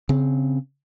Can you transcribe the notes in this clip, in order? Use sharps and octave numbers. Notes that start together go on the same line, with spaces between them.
C#3 C4